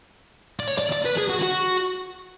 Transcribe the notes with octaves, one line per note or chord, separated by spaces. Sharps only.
D5
C#5
D5
D5
B4
G#4
F#4
F#4